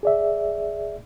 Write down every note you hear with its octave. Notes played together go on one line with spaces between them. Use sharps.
G#4 D5 E5